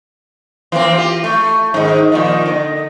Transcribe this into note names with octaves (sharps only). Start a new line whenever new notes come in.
E3 A#3 C4
F4 G4
A3
G#2 D#3
A#2 D#3 F3
D3